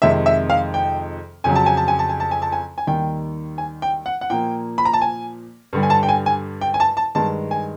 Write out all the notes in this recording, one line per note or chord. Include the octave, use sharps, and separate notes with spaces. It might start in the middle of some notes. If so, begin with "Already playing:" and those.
F2 C3 D#3 G#3 E5
E5
F5
G5
F2 C#3 F#3 G#5
A5
G#5
A5
G#5
A5
G#5
A5
G#5
A5
G#5
G#5
D#2 D#3 G3 G5
G#5
G5
F#5
F#5
A#2 F3 A#3 G5
B5
A#5
A5
G#5
G2 D3 G3
G#5
A5
G5
G#5
G#5
G5
G#5
A5
A5
G2 D#3 G#3 A5
G#5